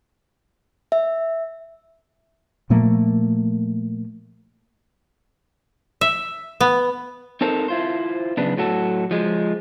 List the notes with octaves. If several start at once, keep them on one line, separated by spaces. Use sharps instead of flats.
E5
A#2 F3 A3 A#3
E5
B3
C4 D#4 A4 A#4 C5
E4 F4 C5
F#2 C#3 B3 D4
A2 F#3 F#4 A4
F3 G#3